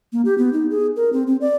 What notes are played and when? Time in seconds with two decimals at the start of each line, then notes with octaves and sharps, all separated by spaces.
0.13 A#3
0.25 G4
0.38 B3
0.53 D#4
0.71 G#4
0.96 A#4
1.13 C4
1.27 C4
1.41 D5